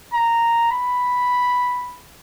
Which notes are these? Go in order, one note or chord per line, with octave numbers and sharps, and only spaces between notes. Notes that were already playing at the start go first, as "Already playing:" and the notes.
A#5
B5